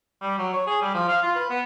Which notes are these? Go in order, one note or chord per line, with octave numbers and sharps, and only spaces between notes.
G3
F#3
C#5
G#4
G3
F3
F5
F4
B4
B3